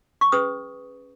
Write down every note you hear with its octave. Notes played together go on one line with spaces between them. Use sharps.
C#6
C#4 G#4 B4 D#6